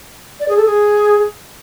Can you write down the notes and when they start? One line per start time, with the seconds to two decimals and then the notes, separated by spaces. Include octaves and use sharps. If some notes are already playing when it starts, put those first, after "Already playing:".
0.40 D5
0.48 G#4
0.57 A4
0.65 G#4